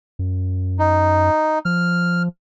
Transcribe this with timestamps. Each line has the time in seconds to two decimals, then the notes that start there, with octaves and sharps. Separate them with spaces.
0.19 F#2
0.79 D#4
1.65 F3 F6